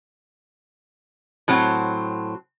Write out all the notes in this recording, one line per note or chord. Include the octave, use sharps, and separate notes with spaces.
A2 F#3 C4